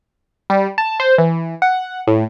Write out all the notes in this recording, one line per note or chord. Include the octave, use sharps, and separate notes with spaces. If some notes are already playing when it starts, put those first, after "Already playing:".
G3
A5
C5
E3
F#5
A2